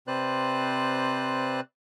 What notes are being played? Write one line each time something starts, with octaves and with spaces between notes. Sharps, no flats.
C3 C4 B4 C5 D5 F#6